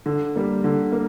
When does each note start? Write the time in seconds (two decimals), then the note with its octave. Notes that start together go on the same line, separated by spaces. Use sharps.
0.06 D3
0.36 G3 A#3
0.64 D3
0.92 A#3